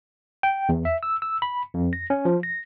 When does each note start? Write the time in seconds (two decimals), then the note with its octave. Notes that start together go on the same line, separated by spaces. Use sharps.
0.43 G5
0.69 E2
0.85 E5
1.03 E6
1.22 E6
1.42 B5
1.74 F2
1.93 A#6
2.10 C#4
2.25 F3
2.43 A#6